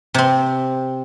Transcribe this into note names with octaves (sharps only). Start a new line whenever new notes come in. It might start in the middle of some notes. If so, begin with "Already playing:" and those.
C3 C4